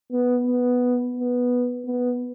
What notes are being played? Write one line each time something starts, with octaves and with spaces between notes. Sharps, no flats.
B3
B3
B3
B3